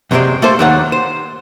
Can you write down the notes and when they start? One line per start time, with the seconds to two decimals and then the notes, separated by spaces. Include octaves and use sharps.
0.11 F#2 C3 F#3 G#3 C5 D5
0.42 A3 A#3 A4 C5
0.59 D#2 D#3 F#3 D4 D5 F#5
0.92 C5